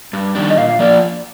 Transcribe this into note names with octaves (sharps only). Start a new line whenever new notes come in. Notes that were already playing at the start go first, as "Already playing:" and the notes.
G2
D#3 G3 D4
D#5
A#2 F5
F3 A#3 F4 D5